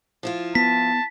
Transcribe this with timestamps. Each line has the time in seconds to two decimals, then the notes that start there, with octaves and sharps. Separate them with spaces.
0.23 F3 E4 F4
0.55 B3 A5 B6